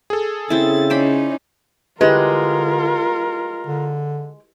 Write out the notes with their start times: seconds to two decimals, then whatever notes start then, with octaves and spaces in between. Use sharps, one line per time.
0.10 G#4 A4
0.50 C#3 C4 E4 A6
0.90 C#4 D#4 C5 D5 B5
2.01 D3 G#3 E4 F4 G4 A#4 B4
3.67 D3